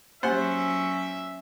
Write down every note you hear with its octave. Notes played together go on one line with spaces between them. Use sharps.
F#3 A#3 C#4 G4 C5 E5 F#5